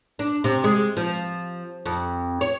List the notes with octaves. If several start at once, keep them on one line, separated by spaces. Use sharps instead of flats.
D4
C3
G#3
F3
F2
C#5